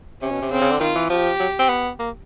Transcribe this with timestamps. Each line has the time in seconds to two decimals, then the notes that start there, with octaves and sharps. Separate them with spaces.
0.22 C3 C#4
0.31 B2
0.42 C3
0.51 C#3 C4
0.62 C#3
0.71 D3
0.80 D#3 F4
0.95 E3
1.10 F3 G4
1.40 F#3
1.59 C4
1.69 B3
1.99 A#3